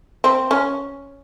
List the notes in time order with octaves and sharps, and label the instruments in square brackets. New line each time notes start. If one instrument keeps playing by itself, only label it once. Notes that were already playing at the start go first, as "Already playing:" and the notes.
[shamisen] C4
C#4